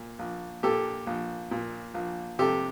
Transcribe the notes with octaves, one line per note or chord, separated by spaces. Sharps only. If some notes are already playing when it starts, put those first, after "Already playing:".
Already playing: A#2
A#1
A#2 G4 A4
A#1
A#2
A#1
C3 G4 A4